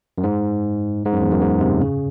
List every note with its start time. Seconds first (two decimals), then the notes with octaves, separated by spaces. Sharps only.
0.18 F#2
0.23 G#2
1.05 G#2
1.12 F#2
1.21 E2
1.32 F#2
1.41 G#2
1.61 C3
1.81 C#3